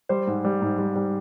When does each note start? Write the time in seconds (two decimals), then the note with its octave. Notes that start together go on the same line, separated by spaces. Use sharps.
0.09 G3 C5
0.27 G#2
0.45 G3
0.62 G#2
0.78 G3
0.96 G3